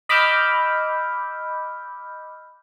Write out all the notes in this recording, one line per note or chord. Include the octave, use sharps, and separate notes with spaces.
D#5 B5 D6 E6 F6 G6